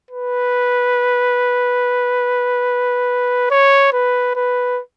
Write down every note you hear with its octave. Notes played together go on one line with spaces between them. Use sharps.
B4
C#5
B4
B4